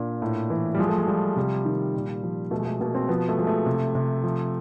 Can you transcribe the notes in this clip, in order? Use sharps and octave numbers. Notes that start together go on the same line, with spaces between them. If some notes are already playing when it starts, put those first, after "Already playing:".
Already playing: A#2 D4
A2
E3
G3
F3 G#3
A3
G#3
F3 G3
C3 G3
D#3
A#2
F3
B2 A3
G#3
A3
B2 A#3
C4
F3 B3
A3
F3 G#3
A3
C3
C3
F3